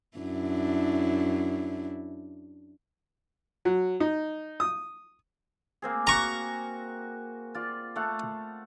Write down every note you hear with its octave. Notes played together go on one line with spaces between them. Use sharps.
F#2 D4 E4
F#3
D#4
D#6
A#3 C4 G#4
F#4 F5 A#5 C#6
F4 D5
A3 F5 F#5